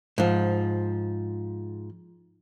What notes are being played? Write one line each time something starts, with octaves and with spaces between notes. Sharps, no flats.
G#2 F3